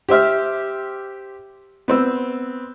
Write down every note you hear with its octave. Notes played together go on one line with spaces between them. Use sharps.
G4 C5 E5 F6
B3 C4 E6